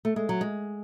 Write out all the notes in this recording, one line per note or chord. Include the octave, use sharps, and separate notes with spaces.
A3
G#3
F#3
G#3